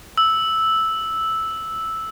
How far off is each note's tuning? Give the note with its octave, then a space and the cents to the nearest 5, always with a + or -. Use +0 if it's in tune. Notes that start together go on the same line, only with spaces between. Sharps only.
E6 -5